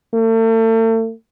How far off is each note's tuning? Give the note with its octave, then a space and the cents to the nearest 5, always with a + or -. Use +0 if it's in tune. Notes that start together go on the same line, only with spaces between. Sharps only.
A3 +40